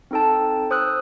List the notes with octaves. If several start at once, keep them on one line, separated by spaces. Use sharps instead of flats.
C4 D#4 A4 G5 A5
C5 D#6 E6 F#6